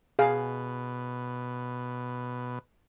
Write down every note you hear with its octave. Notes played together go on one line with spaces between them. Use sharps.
B2 G#4 F5